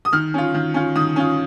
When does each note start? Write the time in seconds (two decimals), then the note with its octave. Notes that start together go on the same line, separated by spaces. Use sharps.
0.05 D#6
0.12 D#3 F6
0.34 C#4 F4
0.54 D#3
0.74 C#4 F4
0.95 D#3 D#6
1.16 C#4 F4